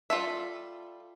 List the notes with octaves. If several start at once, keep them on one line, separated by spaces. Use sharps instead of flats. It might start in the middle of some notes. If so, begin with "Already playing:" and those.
G3 F4 A4 E5